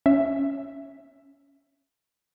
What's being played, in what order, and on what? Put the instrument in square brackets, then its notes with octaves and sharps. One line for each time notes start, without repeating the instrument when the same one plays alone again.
[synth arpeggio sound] C#4 E5